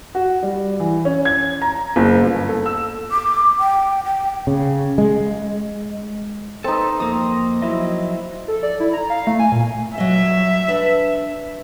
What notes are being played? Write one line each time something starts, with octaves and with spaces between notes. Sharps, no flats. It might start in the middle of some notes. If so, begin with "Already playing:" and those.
F#4
G3
E3
C#4
G#6
A#5
F#1
G1
A4
E6
D6
G5
G5
C#3
G#3
C4 D#4 A4 B4
F2 A#3 D#6
F3 F#3 E4 D#5
A4
D5
E4
A#5
F5
A3
G#5
A#2
F#3 D#5 E5
D4 B4